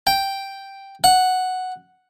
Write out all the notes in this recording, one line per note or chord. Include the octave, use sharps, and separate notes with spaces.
G5
F#5